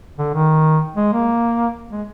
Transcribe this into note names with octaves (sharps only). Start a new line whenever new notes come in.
D3
D#3
G#3
A#3
G#3